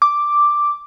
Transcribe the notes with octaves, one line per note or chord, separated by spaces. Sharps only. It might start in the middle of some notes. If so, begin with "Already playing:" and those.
D6